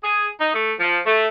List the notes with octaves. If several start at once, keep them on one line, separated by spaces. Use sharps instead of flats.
G#4
D#4
A3
F3
A3